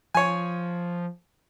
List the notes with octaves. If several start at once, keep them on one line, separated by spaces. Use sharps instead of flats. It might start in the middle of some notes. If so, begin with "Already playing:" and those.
F3 C#5 G#5